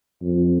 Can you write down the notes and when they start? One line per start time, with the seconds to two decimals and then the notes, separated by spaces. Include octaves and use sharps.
0.22 F2